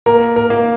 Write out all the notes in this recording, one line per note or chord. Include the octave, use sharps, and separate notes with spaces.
A#3 A#4
A#4
A#3